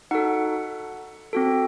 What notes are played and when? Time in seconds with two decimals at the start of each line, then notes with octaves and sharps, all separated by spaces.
0.11 D#4 F#4 A4 F#5
1.33 C4 F#4 A4